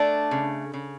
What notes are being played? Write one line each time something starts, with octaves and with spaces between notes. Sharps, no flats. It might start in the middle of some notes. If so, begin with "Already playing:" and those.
Already playing: A3 D4
C#3
C#3